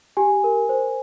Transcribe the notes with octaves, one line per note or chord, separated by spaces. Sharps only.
G4 G#5
A#4
C5